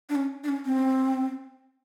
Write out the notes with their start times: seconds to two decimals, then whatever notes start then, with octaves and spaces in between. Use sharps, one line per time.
0.10 D4
0.16 C#4
0.44 D4
0.49 C#4
0.66 C4